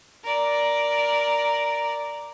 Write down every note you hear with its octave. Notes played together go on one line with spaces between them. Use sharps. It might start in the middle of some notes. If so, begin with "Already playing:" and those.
A#4 D5